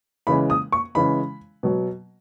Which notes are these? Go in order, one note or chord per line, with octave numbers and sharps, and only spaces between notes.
C#3 E3 G#3 B5
D#6
C#6
C#3 E3 G#3 B5
B2 F#3